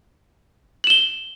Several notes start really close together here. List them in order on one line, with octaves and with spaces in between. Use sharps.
F#7 E7 G7